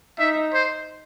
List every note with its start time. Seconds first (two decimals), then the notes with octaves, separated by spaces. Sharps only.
0.19 D#4 E5
0.54 C5